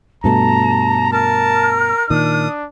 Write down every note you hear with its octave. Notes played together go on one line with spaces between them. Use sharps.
G2 B2 A3 A5 A#5
A#4 A5 F6
A#2 D#3 D4 D#6